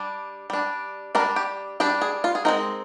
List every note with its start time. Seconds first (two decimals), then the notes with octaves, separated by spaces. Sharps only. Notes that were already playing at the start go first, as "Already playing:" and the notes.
Already playing: G3 D4
0.50 G3 D4
1.15 G3 D4 A#4
1.36 G4
1.80 G3 D4 G4
2.02 G#4
2.24 F4
2.35 G#4
2.45 G#3 C4 D#4 A#4